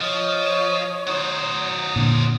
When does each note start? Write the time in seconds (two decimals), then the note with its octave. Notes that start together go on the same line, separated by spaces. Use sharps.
0.01 F3 C#5 D#5
1.08 F#3 D#4 C5
1.96 A#2 D3